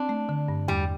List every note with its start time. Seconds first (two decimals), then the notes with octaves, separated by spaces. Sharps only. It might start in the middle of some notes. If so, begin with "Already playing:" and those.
Already playing: C4 D4
0.09 A3
0.29 D3
0.48 G2
0.68 E2 G3